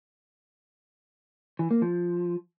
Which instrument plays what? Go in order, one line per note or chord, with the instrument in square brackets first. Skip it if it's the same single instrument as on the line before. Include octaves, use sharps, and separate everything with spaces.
[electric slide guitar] E3
A#3
F3